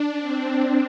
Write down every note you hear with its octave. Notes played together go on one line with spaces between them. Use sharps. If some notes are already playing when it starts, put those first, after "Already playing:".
Already playing: D4
C4